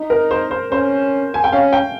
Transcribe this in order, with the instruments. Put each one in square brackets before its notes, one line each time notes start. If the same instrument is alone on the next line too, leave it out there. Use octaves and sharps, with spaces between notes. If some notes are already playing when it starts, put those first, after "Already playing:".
Already playing: [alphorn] D#4
[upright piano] A#4
C5
C5
[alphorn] C#4 [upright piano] C5
[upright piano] G#5
G5
[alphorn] C#4 [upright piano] F5
[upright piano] G5